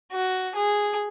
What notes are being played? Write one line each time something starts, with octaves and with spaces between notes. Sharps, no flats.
F#4
G#4